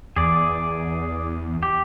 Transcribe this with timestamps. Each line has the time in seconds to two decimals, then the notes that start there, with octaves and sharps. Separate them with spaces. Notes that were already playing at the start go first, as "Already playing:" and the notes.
0.16 E2 G#4 D5
1.63 G4